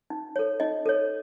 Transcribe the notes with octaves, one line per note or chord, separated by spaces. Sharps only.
D#4
A4 C#5
D#4 D#5
A4 C#5